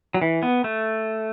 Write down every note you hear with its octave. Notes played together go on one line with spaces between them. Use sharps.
F#3
E3
B3
A3